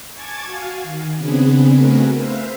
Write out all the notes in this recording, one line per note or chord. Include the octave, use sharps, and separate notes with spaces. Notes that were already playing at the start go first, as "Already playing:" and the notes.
G#5 A5 C#6 D6 G#6 A6
F#4 F5 G#5
D#3
C#3 B3 C4 D4 G#4 B4
A3 C4 F#4 G#4 A#4 B4
B4 C5 E5 F5